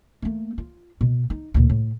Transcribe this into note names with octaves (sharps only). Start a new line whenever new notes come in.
A3 A#3
F4
B2
D#4
D2 A#2
A2